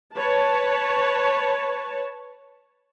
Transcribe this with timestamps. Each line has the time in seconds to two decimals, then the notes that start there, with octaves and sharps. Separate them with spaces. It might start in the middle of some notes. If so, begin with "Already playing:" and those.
0.16 B4 C#5 A5